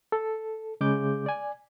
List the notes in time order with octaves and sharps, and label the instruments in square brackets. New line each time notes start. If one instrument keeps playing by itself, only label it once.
[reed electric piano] A4
C#3 G#3 D6 G6
D5 G#5